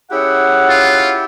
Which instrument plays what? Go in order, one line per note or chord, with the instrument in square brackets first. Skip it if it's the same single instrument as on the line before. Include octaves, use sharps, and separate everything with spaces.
[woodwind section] C#4 G#4 F#5 [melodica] E4 G4
[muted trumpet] F4